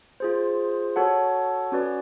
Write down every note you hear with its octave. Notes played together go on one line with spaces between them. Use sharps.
F4 G#4 C5
F#4 A4 C#5 F#5 A5
C#4 F#4 B4 D5